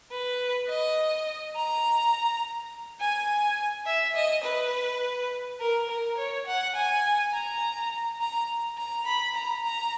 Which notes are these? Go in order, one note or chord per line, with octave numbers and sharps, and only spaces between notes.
B4
D#5
A#5
G#5
E5
D#5
B4
A#4
A#4
C#5
F#5
G#5
A#5
A#5
A#5
B5
A#5
A#5